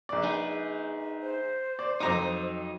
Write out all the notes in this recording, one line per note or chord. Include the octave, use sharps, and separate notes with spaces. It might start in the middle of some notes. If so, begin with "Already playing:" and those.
A#1 D5
D#4 G#4 B4
C5
D5
F2 F#3 D#4 A#5 D6